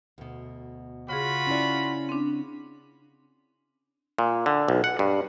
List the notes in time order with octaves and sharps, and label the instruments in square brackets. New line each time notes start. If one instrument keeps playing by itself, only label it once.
[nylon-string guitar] D2 B2
[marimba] C#3 G#4 [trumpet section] F4 F#4 B5
[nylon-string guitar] C#4 E4 D5
[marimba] C4 D4
[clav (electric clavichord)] A#2
D3
B1
F#5
G2